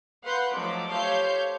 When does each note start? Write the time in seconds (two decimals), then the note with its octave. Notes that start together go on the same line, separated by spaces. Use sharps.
0.24 B4 F5 F#5 C6 G6
0.55 F3 F#3 A3 D#4 D6
0.92 A3 G4 C5 C#5 F5 G6